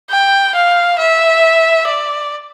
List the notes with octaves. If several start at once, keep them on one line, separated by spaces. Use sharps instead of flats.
G5
F5
E5
D5